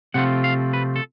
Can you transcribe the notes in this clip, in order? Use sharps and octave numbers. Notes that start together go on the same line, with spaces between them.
C3 F3 A3 C4 F4 F#5
F5
B4
A4